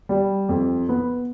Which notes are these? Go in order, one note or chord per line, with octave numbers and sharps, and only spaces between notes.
G3
F2
B3